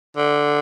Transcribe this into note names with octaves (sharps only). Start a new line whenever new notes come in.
D3